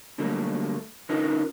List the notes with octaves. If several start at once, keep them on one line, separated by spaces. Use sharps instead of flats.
B2 D3 F#3 G3 A3 A#3
D3 C#4 D#4 F4 A#4 B4